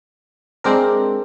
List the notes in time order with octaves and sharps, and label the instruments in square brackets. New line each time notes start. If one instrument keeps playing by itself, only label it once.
[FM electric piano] G#3 C4 D4 A#4